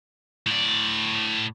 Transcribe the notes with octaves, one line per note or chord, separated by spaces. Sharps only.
A2 D5